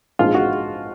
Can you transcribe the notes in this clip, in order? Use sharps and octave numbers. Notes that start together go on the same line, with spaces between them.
A#1 G#2 F3 F4
F#4